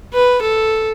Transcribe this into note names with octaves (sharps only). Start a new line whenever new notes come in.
B4
A4